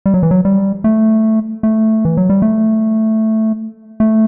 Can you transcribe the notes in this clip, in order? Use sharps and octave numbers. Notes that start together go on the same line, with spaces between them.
G3
F#3
E3
F#3
G3
A3
A3
E3
F#3
G3
A3
A3